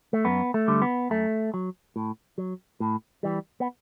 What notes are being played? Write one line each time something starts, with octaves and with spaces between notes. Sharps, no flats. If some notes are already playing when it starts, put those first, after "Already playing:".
A3
F#2 B3
A3
D3 G3
B3
F#2 A3
F#3
A2
F#3
A2
E3 G3
B3